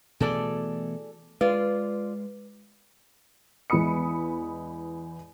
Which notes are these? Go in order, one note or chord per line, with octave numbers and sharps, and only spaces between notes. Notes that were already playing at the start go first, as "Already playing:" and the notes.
B2 E3 A3 G#4 A4 D5
G#3 F4 B4 D5
E2 E3 G#3 B5 D#6 C#7